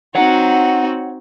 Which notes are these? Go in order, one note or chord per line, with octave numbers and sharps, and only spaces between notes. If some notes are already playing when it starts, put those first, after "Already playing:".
C4 D#4 F#4 C#5 F#5